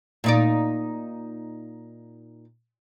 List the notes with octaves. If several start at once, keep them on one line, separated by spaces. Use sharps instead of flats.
A#2 D#4 D5